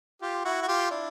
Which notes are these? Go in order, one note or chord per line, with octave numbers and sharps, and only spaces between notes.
F4 G4
E4 F#4
F#4
F4 G4
D4 E4